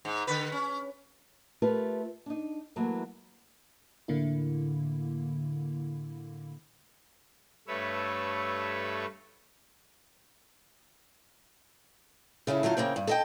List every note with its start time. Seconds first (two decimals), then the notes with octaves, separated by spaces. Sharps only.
0.05 G#2
0.27 D3 B4
0.52 C#4
1.62 A3 F4 G4 A#4 B4
2.26 D4 D#4
2.76 E3 F#3 A3 A#3
4.08 A2 D3 A#3 E4
7.68 G2 A3 B4 C#5 E5
12.47 C#3 A3 C#4 E4
12.63 D3 F#3 A3 F4
12.77 C#3 A#3 C4 G5
12.96 G2
13.07 A4 D#5 G5